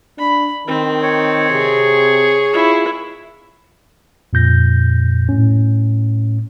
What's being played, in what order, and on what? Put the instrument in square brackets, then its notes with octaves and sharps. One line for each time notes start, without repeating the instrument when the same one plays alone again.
[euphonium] D4 [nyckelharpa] B5
[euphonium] D#3 [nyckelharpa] C4
[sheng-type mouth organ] C#5
[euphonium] C3 [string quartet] G#4
[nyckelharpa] E4 [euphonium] F4
[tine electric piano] F2 A#2 G6 A#6
A2 C#4